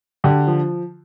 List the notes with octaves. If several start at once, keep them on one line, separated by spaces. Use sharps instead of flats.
D3 G4
F3